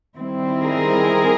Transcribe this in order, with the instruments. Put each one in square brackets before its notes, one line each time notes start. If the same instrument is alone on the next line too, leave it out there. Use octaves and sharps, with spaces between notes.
[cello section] D#3 G3 C4 E4
G#4 A#4